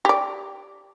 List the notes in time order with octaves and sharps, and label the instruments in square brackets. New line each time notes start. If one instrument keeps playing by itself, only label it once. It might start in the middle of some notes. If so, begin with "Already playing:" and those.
[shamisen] G4 D5